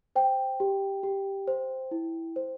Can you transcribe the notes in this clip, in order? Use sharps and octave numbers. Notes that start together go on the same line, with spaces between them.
C5 G5
G4
G4
C5
E4
C5